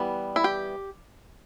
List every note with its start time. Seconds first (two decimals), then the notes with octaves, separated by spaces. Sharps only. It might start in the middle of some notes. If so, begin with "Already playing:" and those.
Already playing: E3 G3 B3
0.36 E4
0.44 G4